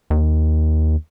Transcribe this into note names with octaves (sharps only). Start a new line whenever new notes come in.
D#2